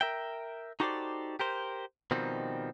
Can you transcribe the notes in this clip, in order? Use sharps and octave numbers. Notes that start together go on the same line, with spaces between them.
A#4 E5 G5
D#4 F#4 G4 A4 C5 D5
G4 A#4 C5
B2 D#3 F3 G3 C4 D#4